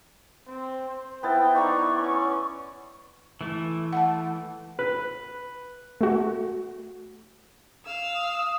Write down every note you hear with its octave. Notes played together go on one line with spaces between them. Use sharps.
C4
C5
B3 E4 G5 A5
B3 D#4 D5 A#5 C6 C#6
C#4
E3 A3
F#5 A5
B4
A3 F#4
F5 E6
D#6